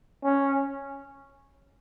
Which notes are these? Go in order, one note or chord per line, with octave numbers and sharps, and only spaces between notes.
C#4